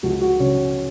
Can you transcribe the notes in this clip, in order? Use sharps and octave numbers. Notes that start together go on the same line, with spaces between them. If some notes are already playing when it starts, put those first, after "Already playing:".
C#2 F#4
F#4
C#3 C#4